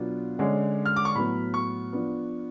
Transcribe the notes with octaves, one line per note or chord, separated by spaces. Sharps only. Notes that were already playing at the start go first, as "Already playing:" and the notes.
Already playing: B2 F#3 B3 D4 F4
D3 G#3 C#4
F6
D6
C#6
A2 F#3 B3 B5
C#6
F3 B3 D4